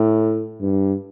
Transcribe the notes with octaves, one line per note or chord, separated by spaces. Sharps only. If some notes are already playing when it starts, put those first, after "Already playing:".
Already playing: A2
G2